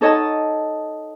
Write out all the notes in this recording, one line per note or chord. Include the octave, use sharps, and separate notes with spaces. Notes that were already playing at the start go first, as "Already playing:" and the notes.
D#4 A4 C#5 D#5 F#5 A5